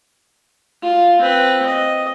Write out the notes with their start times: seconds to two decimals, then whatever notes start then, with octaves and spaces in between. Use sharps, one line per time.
0.82 F4
1.21 C4 B4
1.66 D#5